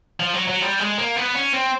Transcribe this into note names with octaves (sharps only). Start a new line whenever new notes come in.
F3
F#3
F#3
G3
G#3
A#3
B3
C#4
C4